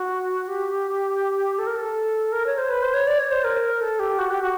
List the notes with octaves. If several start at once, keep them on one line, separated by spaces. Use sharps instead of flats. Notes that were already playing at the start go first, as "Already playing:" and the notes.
Already playing: F#4
G4
A4
A#4
A4
A#4
C#5
C5
B4
C5
C#5
D5
C#5
C5
A#4
A4
G4
F#4
G4
F#4